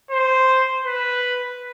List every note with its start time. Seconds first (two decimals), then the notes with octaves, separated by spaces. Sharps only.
0.11 C5
0.84 B4